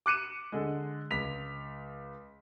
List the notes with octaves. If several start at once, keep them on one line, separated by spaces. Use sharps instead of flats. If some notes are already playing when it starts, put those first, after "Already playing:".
D6 F#6 C#7 D#7 E7
D3 G#3
C#2 B6 F7